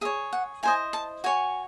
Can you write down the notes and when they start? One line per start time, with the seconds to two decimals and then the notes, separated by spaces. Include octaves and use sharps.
0.01 G#4 E5
0.05 C#5
0.33 F#5
0.63 E4 C5 D#5 G#5
0.93 A5
1.24 F#4 C#5 G#5